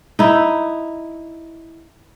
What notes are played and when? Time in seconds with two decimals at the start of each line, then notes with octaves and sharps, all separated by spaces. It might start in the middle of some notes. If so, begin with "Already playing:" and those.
0.19 D#4 E4